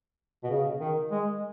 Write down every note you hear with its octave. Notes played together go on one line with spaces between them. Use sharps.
B2
C#3
D#3
G#3